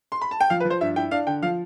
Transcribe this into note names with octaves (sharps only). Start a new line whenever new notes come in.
C6
B5
A5
G5
F3 F5
B4
F3
C5
G2 E5
E4 G5
D4 F5
D3 G5
F3 F5